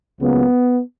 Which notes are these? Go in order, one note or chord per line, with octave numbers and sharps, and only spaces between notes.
C#2 C#3 F#3 A#3 B3